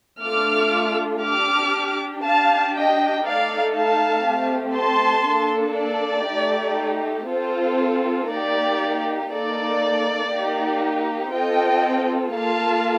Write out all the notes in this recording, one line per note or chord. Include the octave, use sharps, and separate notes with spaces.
A3 D4 F4 A4 D6 F6
D4 G4 D6 F6
D4 G4 F5 A5
D#5 G5
A3 D#4 A4 D5 F5
F5 A5
A3 C4 G4
A5 C6
A#3 D4 A4
D5
A3 D#4 G4
C4 F4 A4 C5
A#3 D#4 G4 D5
A#3 D#4 A4 D5
A#3 D#4 G4
C4 F4 A4 D#5 G5
A#3 F4 A4 F5 A5